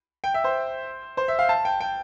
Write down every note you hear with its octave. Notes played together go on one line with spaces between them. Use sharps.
G5
E5
C5
C5
E5
F5
A5
G5
G5